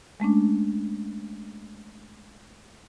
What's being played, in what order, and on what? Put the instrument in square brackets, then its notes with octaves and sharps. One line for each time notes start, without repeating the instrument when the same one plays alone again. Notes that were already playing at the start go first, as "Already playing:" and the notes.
[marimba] G#3 A3 C#4 D4